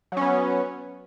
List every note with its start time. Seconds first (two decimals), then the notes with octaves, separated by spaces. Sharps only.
0.12 F#3
0.17 C#4
0.22 B3